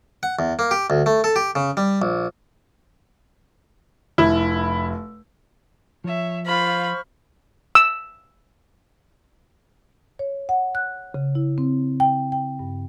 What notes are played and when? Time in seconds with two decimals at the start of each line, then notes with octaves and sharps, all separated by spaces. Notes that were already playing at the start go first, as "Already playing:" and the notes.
0.23 F#5
0.39 E2
0.59 A#3
0.71 G4
0.90 D2
1.06 A3
1.24 A4
1.36 G4
1.55 C#3
1.77 G3
2.02 A#1
4.18 F1 E4
6.04 F3 C#5 E5
6.46 F4 C5 F5 B5 C#6 F6
7.75 E6
10.19 C#5
10.49 F#5
10.75 F#6
11.14 C#3
11.35 E4
11.58 C4
12.00 G5
12.32 G5
12.59 G2